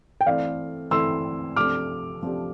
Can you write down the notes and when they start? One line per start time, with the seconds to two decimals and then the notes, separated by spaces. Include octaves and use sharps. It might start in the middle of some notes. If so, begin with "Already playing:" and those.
0.21 G5
0.26 E3 A3 C4 E4 A4 D5 F5
0.91 E3 A3 C4 E4 A4 C6 E6
1.56 C3 F3 A3 D4 G4 D6 F6
2.22 C3 F3 A3 D4 G4